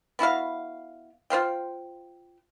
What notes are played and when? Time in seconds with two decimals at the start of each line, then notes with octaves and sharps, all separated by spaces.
0.19 B3 E4 F#4 F5
1.30 F4 C5 F5 G5